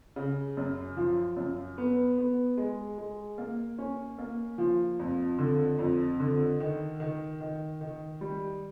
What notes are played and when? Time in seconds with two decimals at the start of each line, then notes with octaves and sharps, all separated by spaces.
0.16 C#3
0.57 F#2
0.97 F3
1.37 F#2
1.78 B3
2.18 B3
2.57 G#3
2.98 G#3
3.38 A#3
3.78 C#4
4.18 A#3
4.58 F3
5.00 F2
5.39 D3
5.79 F2
6.20 D3
6.60 D#3
7.00 D#3
7.40 D#3
7.81 D#3
8.21 G3